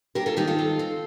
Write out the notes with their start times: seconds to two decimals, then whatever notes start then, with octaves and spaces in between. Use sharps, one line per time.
0.15 F2 G4 A#4
0.26 F4 A4
0.37 D#3 D#4 G4
0.47 F4 A4
0.58 C4
0.79 C4